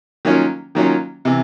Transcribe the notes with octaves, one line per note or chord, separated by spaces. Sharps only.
D#3 F#3 A#3 C#4 F4
D#3 F#3 A#3 C#4 F4
C3 E3